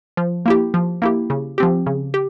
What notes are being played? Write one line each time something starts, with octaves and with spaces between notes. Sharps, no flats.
F3
A#3 E4 G4
F3
A#3 E4 G4
C#3
F3 C4 G4
C#3
G4